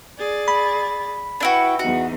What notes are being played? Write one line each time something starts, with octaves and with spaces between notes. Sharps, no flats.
G#4 D5 A6
B5
D4 E4 F#4 B4 G5
E2 D#4 F#4